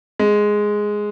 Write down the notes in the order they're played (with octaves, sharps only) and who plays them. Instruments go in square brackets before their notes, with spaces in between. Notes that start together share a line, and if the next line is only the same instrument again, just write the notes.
[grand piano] G#3